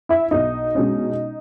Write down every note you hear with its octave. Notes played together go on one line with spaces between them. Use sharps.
E4 E5
B1 D#4 D#5
B2 G#3 C#4